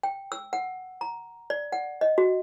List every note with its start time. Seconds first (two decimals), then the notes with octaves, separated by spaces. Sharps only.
0.03 G5
0.32 E6
0.53 F#5
1.01 A#5
1.50 D5
1.72 F#5
2.01 D#5
2.18 F#4